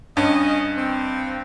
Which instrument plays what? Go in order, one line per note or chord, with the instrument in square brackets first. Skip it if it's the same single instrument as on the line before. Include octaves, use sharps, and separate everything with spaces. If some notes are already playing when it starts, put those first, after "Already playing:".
[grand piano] G2 [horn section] C#4 D#5
[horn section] C4